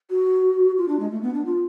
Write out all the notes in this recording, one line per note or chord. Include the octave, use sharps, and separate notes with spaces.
F#4
F4
D4
G#3
A3
B3
D4
F4